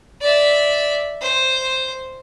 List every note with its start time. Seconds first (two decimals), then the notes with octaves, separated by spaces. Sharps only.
0.21 D5 E5
1.21 C5